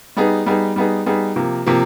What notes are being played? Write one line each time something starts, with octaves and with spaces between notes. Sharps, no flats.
G3 B3 D#4 G#4
G3 B3 D#4 G#4
G3 B3 D#4 G#4
G3 B3 D#4 G#4
C3 F3 A#3
C3 F3 A#3